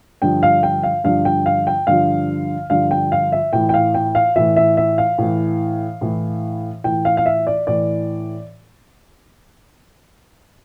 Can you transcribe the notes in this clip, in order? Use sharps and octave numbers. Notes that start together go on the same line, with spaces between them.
G2 D3 F3 G5
F5
G5
F5
G2 D3 F3 F5
G5
F5
G5
G2 D3 F3 F5
G2 D3 F3 F5
G5
F5
E5
A2 E3 G5
G5
F5
G5
F5
A2 E3 E5
E5
E5
F5
A2 E3
A2 E3
A2 E3 G5
F5
F5
E5
D5
A2 E3 D5